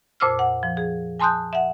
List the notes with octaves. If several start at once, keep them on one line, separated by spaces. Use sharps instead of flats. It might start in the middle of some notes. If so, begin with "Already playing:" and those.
F2 A#2 C5 D6 E6 F6
F#5
F3
G#4
G#5 A5 C6 D#6 F#6 G6
E5 F#5